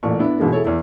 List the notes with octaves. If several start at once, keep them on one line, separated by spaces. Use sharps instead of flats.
A1 A#2 C#6
B3 D4 E4
G#2 B2 E3 G#3 A#3
E4 G#4 A4 C#5
E2 E4